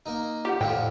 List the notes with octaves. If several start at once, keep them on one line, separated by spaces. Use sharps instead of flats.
A#3 D#4
F4 G4 F#5
F2 A2 D3 F4 G5